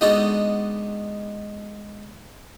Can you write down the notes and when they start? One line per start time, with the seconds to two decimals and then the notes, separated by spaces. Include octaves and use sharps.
0.01 G#3 B3 D4 D#4 F#4 A4